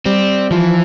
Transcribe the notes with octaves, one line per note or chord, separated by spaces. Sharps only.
G3 C4
E3 F3